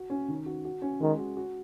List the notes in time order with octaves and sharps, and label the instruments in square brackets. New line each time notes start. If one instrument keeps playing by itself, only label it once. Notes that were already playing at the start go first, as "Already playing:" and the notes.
Already playing: [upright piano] F#4
C#4
D#3
F#4
F#4
C#4
[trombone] D#3 [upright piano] G#3
[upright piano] F#4
F#4